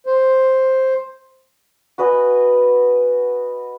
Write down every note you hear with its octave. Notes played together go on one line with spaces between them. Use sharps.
C5
F#4 B4 D#5 G#5